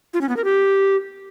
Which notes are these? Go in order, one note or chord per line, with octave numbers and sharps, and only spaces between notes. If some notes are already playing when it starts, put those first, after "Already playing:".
F4
C#4
B3
A#4
G4